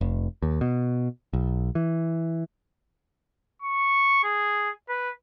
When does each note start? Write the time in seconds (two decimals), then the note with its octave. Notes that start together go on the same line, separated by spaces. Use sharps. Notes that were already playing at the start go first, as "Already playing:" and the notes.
0.01 F1
0.42 D#2
0.61 B2
1.33 B1
1.75 E3
3.62 C#6
4.23 G#4
4.89 B4